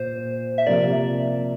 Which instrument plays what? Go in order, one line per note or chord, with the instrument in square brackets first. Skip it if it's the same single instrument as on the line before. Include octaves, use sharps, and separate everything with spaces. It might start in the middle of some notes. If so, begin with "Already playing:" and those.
Already playing: [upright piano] A#2 [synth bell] C5
[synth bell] E5
[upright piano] C3 F3 A#3 [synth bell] D5